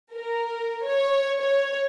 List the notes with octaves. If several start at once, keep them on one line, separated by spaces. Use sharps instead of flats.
A#4
C#5
C#5